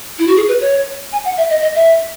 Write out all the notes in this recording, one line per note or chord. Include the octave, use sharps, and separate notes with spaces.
E4
F#4
G#4
B4
C#5
G#5
F#5
E5
D#5
D#5
E5